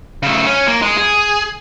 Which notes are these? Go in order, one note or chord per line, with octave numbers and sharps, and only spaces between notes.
C#3 A3
C#4
A#3
G#3
G#4